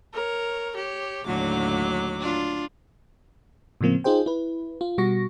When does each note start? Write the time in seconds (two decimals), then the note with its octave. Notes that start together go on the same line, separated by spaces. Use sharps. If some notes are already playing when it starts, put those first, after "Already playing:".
0.14 A#4 C#5
0.76 G4 C#5
1.25 D#2 A2 D3 F#3 D6
2.20 D4 F4
3.81 A2 C#3 F3 A#3 C4
4.04 D#4 F4 G#4 C5 G5
4.26 E4 B4
4.81 F4
4.98 B2 G3 F#4 C#6 A#6